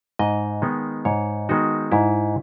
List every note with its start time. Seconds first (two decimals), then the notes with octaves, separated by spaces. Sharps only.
0.19 G#2 D#5
0.62 D#3 G#3 B3 D#4
1.05 G#2 C#5
1.49 D#3 G#3 B3 D#4 F#4
1.92 G#2 E4